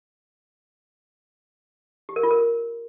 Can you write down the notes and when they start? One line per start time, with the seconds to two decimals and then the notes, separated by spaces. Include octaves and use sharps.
2.09 G4
2.16 A#4
2.23 F4
2.31 A#4